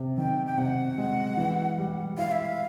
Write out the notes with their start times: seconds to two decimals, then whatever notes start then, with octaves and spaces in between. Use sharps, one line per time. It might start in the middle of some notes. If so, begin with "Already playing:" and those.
Already playing: C3
0.17 D#3 G5
0.46 G5
0.57 C3 F#5
0.98 G#3
1.37 E3
1.78 G3
2.18 E4 F5
2.31 E5
2.45 F5